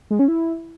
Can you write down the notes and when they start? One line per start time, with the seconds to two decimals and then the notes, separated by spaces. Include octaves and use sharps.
0.10 G#3
0.19 C#4
0.28 E4